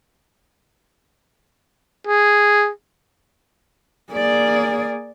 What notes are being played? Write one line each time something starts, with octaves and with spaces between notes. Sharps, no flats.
G#4
A#3 G#4 D5